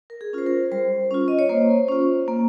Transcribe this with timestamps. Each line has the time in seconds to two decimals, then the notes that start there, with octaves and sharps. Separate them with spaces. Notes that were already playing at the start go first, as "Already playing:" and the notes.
0.10 A#4
0.21 G#4
0.33 C#4 F4 C5
0.46 A#4
0.72 G3 C5
1.11 C#4 F4
1.28 D#5
1.39 C#5
1.49 A#3 C5
1.89 C#4 F4
2.28 A#3